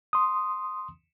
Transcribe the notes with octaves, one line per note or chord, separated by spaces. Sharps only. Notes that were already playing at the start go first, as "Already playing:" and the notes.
C6 D#6